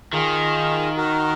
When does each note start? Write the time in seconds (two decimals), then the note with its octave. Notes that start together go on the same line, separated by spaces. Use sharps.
0.13 D#3 F4 G#4
0.97 F#4 A#4